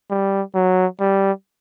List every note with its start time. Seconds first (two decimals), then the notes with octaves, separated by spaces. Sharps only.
0.10 G3
0.55 F#3
1.00 G3